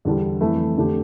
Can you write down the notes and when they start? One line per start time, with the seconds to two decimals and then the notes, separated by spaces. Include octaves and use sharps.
0.05 E2 D3 G3 D4
0.41 F2 E3 A3 E4
0.76 F2 D3 A3 D4 G4